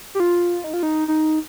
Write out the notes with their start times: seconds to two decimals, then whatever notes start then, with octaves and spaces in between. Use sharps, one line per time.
0.15 G4
0.20 F4
0.64 D#4
0.74 F4
0.83 D#4
1.08 D#4